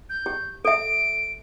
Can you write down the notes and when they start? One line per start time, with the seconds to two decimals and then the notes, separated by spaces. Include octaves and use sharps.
0.10 G6
0.26 G4
0.65 A4 E5 D7